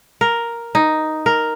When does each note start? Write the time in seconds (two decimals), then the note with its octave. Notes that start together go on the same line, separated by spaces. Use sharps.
0.21 A#4
0.75 D#4
1.26 A#4